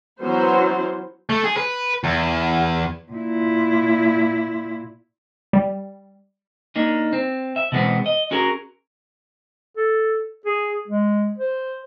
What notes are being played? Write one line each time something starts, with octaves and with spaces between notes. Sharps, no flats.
E3 F#3 B3 C#4 C5
A3
G#4
B4
E2
A#2 E4
G3
A#3 D4 D#4
C4
E5
B2 E3 G#3 B3 C4
D#5
C#4 F#4 G#4 A#4
A4
G#4
G#3
C5